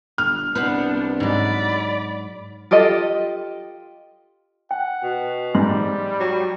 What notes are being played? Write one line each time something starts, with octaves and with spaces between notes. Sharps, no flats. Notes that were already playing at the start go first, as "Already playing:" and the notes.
G1 F6
C2 B3 D4 B4 C5 F#5
G#2 F#3 D5 B5
F4 G4 A4 D#5
F#5 G5
B2
G#2 G3 C6
F#3